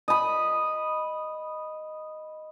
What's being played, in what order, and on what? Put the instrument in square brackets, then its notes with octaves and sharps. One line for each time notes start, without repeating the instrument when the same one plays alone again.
[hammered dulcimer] D#5 B5